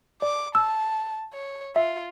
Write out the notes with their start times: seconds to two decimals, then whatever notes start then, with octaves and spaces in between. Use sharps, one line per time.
0.22 D5 D6
0.55 A5 E6
1.33 C#5
1.76 F4 E5